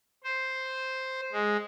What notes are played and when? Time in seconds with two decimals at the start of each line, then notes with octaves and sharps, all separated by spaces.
0.24 C5
1.32 G#3